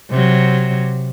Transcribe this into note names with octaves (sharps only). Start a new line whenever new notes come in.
C3 F#3